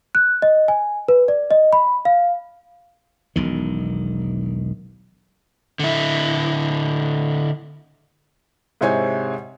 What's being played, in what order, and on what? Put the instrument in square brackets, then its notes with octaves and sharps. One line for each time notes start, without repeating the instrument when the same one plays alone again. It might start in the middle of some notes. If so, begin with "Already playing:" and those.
[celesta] F#6
D#5
G#5
B4
D5
D#5
B5
F5
[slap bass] E1 B1 D#3
[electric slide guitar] D3 E4
[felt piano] G#2 C3 E4 C5 C#5 G#5